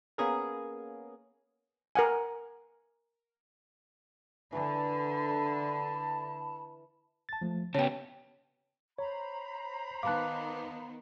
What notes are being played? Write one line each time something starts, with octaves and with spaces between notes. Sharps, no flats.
A#3 B3 C#4 G#4 A#4
A#4 F#5 G#5
D3 E3 A5 B5
A5 A6
F3 A3
C#3 B3 C#5 G5 A5
C5 C#5 A#5 B5
D#3 B3 F5 A5 D6 F#6